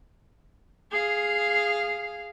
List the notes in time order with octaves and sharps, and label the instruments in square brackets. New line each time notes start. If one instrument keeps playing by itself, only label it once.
[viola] G#4 F5